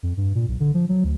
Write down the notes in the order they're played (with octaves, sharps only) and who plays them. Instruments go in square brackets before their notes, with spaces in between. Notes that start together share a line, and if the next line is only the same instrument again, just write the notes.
[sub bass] F2
G2
A#2
B1
D3
F3
F#3
D2